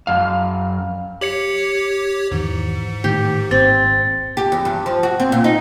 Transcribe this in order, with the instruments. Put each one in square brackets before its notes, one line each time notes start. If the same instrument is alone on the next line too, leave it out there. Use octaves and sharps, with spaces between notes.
[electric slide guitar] F#2 F5
[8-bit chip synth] G4 C#5 [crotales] C#7 F#7
[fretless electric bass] E2 D#3 E3 [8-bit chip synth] G#2
[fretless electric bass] A2 D#3 [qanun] G4
[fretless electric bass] G#1 A#2 [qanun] C4 [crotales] A6
[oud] G4
E2
G2
F3
F#4
C4
A#2
D#4